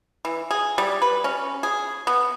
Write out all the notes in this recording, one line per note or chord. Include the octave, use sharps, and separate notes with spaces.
E3
G#4
G3
B4
C#4
G#4
B3